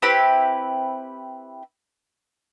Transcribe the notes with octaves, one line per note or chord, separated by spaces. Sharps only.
C4 E4 G4 B4